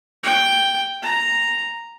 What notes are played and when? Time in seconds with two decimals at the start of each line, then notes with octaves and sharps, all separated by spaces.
0.23 G5
1.03 A#5